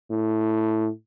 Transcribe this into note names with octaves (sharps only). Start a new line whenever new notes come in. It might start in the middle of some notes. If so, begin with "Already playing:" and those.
A2